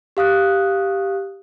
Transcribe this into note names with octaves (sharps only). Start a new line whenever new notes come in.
G4 F5 D#6 F#6